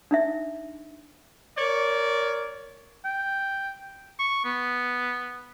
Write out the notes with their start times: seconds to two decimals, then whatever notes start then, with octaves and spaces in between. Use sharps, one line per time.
0.11 D4 D#4 E5
1.58 A#4 C#5 D5
3.05 G5
4.19 C#6
4.45 B3